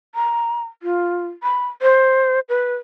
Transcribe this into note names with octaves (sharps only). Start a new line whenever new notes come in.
A#5
F4
B5
C5
B4